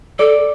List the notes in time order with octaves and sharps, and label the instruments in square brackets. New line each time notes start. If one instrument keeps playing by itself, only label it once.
[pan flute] A4 [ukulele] D5